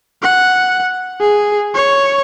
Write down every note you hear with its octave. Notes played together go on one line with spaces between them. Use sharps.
F#5
G#4
C#5